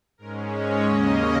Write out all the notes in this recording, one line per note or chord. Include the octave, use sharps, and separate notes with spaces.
G#2 G#3 C#4 A#4
C#5
D#2 C#3 A#3 C#4 D#5